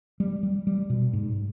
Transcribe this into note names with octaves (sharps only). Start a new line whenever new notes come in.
G3
G3
G3
B2
G#2